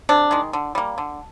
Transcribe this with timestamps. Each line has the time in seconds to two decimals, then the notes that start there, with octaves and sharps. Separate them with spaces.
0.09 C3 D4
0.31 D#3 G#3
0.53 D3
0.75 G3 A#3
0.98 D3